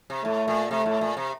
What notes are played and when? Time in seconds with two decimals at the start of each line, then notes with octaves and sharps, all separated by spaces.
0.10 C3
0.24 A2 A3
0.48 A#2
0.71 C3 A3
0.86 A2
1.01 A#2
1.17 C3